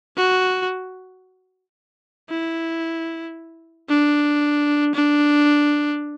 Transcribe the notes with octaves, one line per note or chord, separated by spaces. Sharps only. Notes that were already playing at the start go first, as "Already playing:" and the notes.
F#4
E4
D4
D4